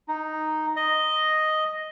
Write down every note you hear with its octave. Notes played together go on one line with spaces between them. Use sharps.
D#4
D#5